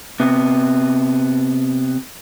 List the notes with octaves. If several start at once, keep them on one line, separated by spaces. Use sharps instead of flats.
C3 B3